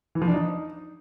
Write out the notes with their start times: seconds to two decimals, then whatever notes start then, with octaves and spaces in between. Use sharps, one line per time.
0.15 E3
0.22 F3
0.28 D4
0.34 D#4